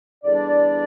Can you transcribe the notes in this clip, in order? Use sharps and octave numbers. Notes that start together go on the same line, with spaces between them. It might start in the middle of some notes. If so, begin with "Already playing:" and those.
E2 D3 G3 D4 D5